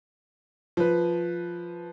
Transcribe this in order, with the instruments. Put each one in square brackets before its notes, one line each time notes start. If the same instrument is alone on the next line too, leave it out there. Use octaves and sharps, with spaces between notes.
[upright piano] F3 B4